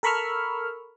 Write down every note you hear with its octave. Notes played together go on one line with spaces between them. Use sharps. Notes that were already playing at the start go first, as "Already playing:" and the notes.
A4 A#4 B5 C#6 E6 F6